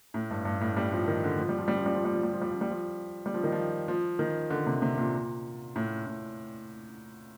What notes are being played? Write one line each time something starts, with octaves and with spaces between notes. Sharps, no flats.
A2
G2
G2
A2
G3
F3
D#3
D3
F3
G3
F3
G3
F3
G3
F3
G3
F3
G3
F3
G3
F3
G3
F3
G3
F3
D#3
F3
F3
D#3
D3
C3
C3
A#2
A2
A2